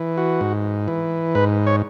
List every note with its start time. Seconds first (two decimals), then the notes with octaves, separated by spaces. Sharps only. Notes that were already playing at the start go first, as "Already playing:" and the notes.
Already playing: E3
0.18 F#4
0.41 G#2
0.88 E3
1.35 G#2 B4
1.67 C#5